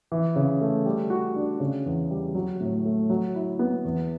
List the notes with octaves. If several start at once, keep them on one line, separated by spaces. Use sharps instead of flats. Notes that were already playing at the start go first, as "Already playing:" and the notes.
E3
C#3
A3
G3
F#4
D4
C#3
E2
G3
F#3
A2
A3
F#3
E4
B3
E2